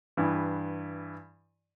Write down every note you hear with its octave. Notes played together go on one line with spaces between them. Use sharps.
G2 E3